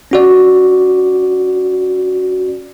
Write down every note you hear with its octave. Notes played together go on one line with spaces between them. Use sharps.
C#4 F#4 D5